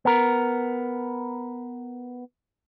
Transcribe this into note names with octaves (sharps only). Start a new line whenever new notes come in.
B3 A#4